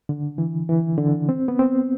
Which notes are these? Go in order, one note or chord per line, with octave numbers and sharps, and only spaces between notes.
D3
E3
E3
D3
C4
B3
C4